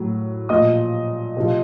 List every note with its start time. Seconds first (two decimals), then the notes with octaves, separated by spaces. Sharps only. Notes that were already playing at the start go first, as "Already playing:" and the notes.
Already playing: A2 F#3
0.49 A#2 F3 D#5 D#6
1.37 C3 F3